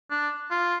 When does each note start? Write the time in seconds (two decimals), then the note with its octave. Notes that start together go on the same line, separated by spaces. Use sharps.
0.11 D4
0.51 F4